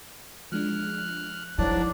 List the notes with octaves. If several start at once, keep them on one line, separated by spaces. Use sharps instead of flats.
F3 G#3 D4 F6 F#6
G#2 F3 D4 E4 C#5 D5